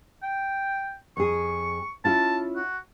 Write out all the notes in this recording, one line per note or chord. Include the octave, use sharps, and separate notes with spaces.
G5
F2 G#4 C#6
C#4 E4 F4 A5
F#4